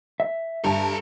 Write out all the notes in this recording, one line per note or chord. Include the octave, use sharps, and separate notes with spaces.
E5
G2 A4 A5 A#5